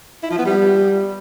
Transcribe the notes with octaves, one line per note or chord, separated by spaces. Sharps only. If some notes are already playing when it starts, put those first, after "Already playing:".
E4
F3
B3
G3